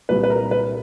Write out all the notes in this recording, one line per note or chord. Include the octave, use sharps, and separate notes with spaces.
C2 A#2 G3 B4
B4
A#4
B4